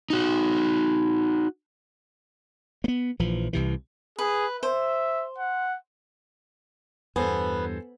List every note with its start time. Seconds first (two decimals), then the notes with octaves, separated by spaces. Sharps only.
0.10 D#4 F#4
2.84 A#3 B3
3.19 A#1 E3 F3
3.53 C2 C3 E3
4.19 G#4 B4
4.63 C5 E5
5.38 F#5
7.16 E2 G2 B3 A4 C5 G#5